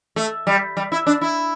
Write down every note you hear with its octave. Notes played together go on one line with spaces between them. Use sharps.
A3
G3
G3
E4
D4
E4